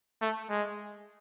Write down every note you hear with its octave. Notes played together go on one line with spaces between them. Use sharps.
A3
G#3